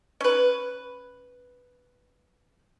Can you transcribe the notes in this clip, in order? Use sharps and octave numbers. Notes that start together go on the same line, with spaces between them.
C#4 B4